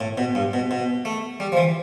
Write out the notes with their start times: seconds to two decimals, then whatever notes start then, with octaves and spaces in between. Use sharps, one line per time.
0.01 A2
0.18 B2
0.35 G2
0.53 B2
0.71 B2
1.05 A3
1.40 G3
1.52 F3
1.57 E3